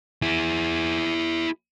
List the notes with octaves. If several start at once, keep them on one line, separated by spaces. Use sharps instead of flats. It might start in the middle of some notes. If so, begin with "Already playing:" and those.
E4 G#4